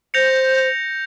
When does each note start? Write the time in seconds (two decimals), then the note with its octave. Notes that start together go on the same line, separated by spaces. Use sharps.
0.14 C5 G6 A#6 C#7 F7